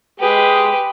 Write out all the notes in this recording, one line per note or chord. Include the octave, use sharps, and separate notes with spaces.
G#3 G4 G#4 B4